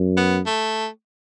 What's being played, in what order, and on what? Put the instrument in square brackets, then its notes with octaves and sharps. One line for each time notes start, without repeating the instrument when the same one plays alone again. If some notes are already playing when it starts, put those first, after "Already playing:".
Already playing: [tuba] F#2
[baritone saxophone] B3
A3